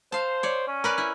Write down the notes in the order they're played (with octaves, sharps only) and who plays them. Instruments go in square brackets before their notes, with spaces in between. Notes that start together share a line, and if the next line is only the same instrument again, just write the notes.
[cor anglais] C5 [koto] F5 A5
[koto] C#5 D5
[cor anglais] C#4
[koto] A#4 B4 D5
E4